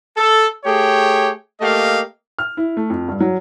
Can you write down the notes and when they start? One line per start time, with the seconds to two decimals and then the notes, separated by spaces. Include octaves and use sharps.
0.16 A4
0.65 A3 G4 G#4 C#5 G5
1.60 A3 A#3 G4 D#5 F5
2.39 F6
2.57 E4
2.77 A3
2.90 F2
3.08 G2
3.20 F#3